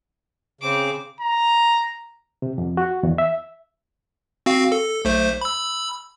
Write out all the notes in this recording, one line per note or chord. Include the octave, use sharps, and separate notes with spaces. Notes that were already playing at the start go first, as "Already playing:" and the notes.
C#3 C4 D6
A#5
C3
F2
F#4
E2
E5
C4 F#4 F5
A4
B1 A3 C5
B5 E6